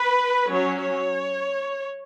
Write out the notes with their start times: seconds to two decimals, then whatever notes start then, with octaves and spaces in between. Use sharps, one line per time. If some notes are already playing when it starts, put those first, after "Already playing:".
Already playing: B4
0.48 F#3 C#4 C#5
0.80 C#5